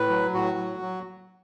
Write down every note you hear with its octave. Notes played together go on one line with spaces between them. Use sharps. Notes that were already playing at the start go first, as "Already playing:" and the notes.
Already playing: A2 B4
F#3
A2 F#4
F#3
F#3